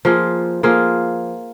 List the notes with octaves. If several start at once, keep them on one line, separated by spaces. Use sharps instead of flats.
F3 A#3 F4 G#4
F3 A#3 F4 G#4